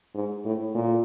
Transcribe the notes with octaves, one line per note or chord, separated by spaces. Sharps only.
G#2
A2
A#2